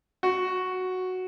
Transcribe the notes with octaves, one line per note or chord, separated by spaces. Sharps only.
F#4